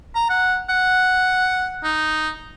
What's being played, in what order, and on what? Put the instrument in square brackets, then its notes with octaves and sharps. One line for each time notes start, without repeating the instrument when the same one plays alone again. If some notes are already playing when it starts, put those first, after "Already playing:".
[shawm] A#5
F#5
F#5
D#4